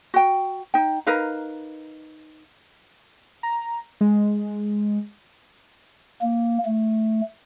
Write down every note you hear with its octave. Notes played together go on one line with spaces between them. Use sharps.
F#4 G5
D#4 G5
D#4 A#4 B4 F5
A#5
G#3
A#3
A3